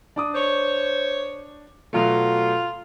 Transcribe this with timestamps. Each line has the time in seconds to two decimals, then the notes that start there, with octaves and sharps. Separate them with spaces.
0.16 D4 D6 D#6
0.33 C5 C#5
1.93 B2 F#3 A3 F4